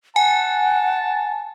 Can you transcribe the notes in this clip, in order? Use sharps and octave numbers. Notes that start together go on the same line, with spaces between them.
F#5 G#5 A5